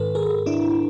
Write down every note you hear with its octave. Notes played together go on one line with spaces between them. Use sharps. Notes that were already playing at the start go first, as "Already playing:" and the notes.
Already playing: G#2 D#3 A4 B4
G#4 A#4
D4 E4